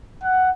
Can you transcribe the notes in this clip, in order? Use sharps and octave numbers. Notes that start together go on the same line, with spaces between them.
F#5